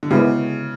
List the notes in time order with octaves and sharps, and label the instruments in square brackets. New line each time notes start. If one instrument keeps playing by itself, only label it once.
[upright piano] D3
[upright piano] C#3 [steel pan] G#3 B3 E4 G4